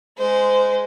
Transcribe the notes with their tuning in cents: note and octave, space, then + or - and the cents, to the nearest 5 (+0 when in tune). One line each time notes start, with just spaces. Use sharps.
G#3 +0 C5 -25